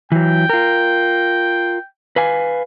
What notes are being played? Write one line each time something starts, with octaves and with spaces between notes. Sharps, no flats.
E3 F#3 G5
F4 A#4
B4 F5 G#5